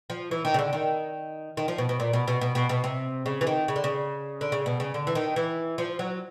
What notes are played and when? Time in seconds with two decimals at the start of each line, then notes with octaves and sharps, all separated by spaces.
0.10 F3
0.31 E3
0.45 D#3
0.54 C#3
0.59 D3
0.73 D#3
1.57 D#3
1.68 F3
1.78 B2
1.89 B2
2.00 A#2
2.13 B2
2.28 B2
2.41 B2
2.55 B2
2.69 B2
2.84 C3
3.26 C#3
3.41 E3
3.47 D#3
3.68 C#3
3.76 D3
3.84 C#3
4.41 D3
4.52 C#3
4.66 B2
4.80 C#3
4.94 D3
5.07 E3
5.15 D#3
5.36 E3
5.78 F3
5.99 F#3